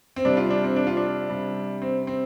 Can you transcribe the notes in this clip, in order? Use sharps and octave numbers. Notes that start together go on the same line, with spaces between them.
C4
C3 G3 D4
F4
D4
C4
D4
F4
D4
C3 G3
C4
C4